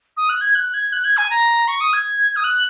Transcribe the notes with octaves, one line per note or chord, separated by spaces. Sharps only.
D#6
F#6
G#6
F#6
G#6
F#6
G#6
G#5
A#5
C#6
D#6
G#6
D#6
F#6